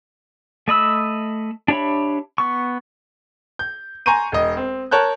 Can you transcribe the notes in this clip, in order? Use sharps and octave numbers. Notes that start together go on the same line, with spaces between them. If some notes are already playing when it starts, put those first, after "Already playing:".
A3 D#5 B5 E6
D4 G4 C#5 E5 B5
B3 C#6
G6
G#5 A#5 C6 C#6 G6 D#7
E1 D#5
C4
A#4 C#5 A5 F#6 G6